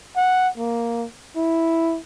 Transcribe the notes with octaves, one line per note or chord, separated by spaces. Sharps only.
F#5
A#3
E4